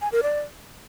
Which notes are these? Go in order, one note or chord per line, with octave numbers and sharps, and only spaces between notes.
G#5
A#4
D5